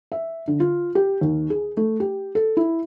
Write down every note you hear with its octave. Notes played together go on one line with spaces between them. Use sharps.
E5
D3
F4
G4
D#2
G#4
A3
G4
A4
E4